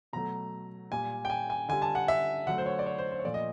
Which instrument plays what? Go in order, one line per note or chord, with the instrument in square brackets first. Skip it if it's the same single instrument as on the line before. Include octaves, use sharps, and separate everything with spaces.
[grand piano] B2 F#3 A3 A#5
A#2 G3 G#5
G5
G#5
G#5
D3 G3 G#5
A5
F#5
E5
D3 F#3 A3 F#5
C5
C#5
D5
C#5
C5
C5
C#5
A#2 F3 A3 D5
D#5